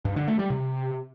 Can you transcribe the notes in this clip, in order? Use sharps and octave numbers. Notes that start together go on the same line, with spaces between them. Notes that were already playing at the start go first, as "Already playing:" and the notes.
G2
D3
A3
G3
C3